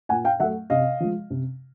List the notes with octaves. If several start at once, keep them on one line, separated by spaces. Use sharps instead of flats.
A#2 F#5 G#5
F5 G5
F#3 A3 E5 F#5
C3 D#5 F5
F3 G#3
C3